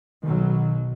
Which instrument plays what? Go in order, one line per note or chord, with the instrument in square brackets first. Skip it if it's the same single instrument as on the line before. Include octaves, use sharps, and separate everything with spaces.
[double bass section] B1 B2 F#3 [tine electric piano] D#3